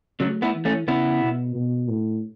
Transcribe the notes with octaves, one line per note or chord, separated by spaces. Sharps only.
C#3 F#3 A3
B3 E4
E3
A3 C#4
C#3 B3 E4
B2
B2
A2